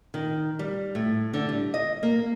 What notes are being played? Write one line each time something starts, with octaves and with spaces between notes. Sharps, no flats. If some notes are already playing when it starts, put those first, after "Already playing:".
D#3
G3
A2
D3
G3
D#5
A#3